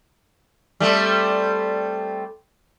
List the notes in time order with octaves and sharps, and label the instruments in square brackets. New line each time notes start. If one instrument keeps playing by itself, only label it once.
[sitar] G3 A3 C4